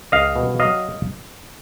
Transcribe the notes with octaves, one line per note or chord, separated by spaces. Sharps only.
C#2 D#5 F5
B2
F#3 D#5 F5